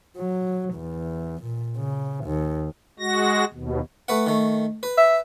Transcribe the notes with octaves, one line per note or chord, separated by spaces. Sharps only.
F#3
E2
A#2
C#3
D#2
G#3 F#4 A#6
D#2 B2
A3 B4 F#5
D#3 A3
B4
E5